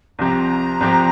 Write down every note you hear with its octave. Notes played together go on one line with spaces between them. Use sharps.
C2 C3 F3 C4 G4 A#5
C2 C3 F3 C4 G4